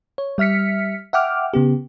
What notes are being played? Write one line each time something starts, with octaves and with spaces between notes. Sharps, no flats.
C#5
G3 E5 F6 B6 C#7
E5 F#5 G5 D6 F6
C#3 B3 G4